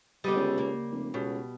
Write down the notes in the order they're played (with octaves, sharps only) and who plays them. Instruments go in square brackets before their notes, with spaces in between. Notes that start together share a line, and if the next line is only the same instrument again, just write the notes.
[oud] D3 B3 D#5 [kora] G3 G4
[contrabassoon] C#2
[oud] C#3 A#3
[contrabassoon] F1
[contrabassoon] C#2 [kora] B2 [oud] G4